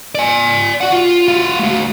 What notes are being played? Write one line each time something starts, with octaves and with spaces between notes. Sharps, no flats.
D5 G#5
F#4 F#5
F4
F#4 F5
A3 F#4